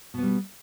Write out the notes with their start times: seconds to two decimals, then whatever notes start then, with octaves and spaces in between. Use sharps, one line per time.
0.14 B2
0.18 B3
0.23 G3